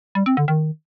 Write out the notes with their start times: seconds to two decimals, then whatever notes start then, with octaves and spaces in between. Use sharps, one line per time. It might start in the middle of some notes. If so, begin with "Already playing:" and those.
0.15 G3
0.26 C4
0.37 D3
0.48 D#3